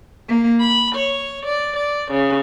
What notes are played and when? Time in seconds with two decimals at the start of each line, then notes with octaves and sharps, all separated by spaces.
0.28 A#3
0.61 B5
0.97 C#5
1.47 D5
1.77 D5
2.11 C#3